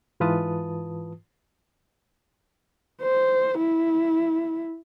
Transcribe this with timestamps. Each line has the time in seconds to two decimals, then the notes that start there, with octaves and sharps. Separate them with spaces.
0.20 G#2 E3 F4 B4 A5 D#6
3.01 C5
3.58 E4